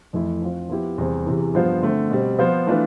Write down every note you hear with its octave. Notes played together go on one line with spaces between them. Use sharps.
F2 E3 A3 E4
F3 C4 F4
F3 B3 E4 G4
E2 C3 G3 C4
E2 C3 E3
G2 F3 B3 F4 C5
D3 A3 C4
B2 G3 C4
F3 B3 F4 C5
E3 A3 D4 F4 B4